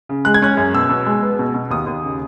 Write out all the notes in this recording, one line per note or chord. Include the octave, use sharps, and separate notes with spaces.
C#3
G#3 F#6
G#6
C#4 F#6
F#2
B2 E6
B2
G#3
B3
B2
B2
D#2 D#6
D#2
C#3